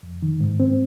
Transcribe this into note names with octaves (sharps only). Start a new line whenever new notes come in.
F2
D#3
G#2
C4